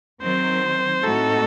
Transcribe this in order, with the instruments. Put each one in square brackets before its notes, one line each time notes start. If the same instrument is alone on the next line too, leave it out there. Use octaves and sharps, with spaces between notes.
[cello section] D#3 F#3 C4 [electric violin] C5
[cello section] A2 A3 C4 D#4 F#4 [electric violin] A4